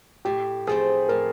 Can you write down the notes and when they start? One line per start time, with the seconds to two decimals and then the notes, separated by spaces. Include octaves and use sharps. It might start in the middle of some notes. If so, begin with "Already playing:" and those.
0.25 A2 G4
0.67 F3 A3 C4 G#4
1.09 A2 A#4